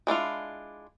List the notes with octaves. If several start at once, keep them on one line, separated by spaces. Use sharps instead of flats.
G#3 D4 E4 F4